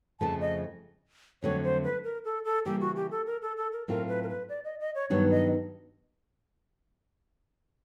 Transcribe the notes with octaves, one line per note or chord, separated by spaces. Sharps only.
F2 C#3 F3 A3 A5
D#5
F2 D3 F#3 A3 C4 C#5
C5
B4
A#4
A4
A4
C#3 E3 G3 A#3 G4
F#4
G4
A4
A#4
A4
A4
A#4
A2 F#3 A3 C4 F4 A#4
B4
A#4
B4
D5
D#5
D#5
C#5
G2 D#3 F#3 B3 D4 C#5
D#5